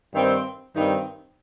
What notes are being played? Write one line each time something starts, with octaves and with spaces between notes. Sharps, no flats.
G2 D#3 C4
G2 D#3 C4 D#4